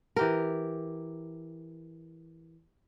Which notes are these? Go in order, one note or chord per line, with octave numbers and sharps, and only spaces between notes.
E3 G4 A#4